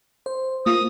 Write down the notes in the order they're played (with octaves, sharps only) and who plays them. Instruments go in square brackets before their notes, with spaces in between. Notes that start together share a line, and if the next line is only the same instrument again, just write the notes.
[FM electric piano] C5
[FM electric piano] A#3 F4 [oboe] D#6